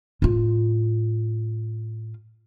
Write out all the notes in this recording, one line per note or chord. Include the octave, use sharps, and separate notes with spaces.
A2 F4